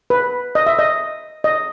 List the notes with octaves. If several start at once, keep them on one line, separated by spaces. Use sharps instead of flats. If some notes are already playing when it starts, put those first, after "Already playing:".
B4
D#5
E5
D#5
D#5